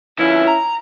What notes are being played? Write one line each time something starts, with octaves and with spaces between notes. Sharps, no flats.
D3 F3 C#4 E4
A#5